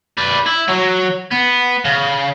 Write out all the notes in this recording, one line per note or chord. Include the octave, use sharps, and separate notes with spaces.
B4 D5
E4
F#3
B3
C#3